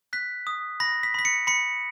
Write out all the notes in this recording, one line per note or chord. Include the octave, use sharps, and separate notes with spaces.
F#6 B6
D#6
B5 A#6
B6
B5 B6
C#7
B5 C#7